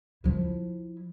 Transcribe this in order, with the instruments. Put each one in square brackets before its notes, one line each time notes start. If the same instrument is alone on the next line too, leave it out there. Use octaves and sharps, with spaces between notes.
[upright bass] F3 E4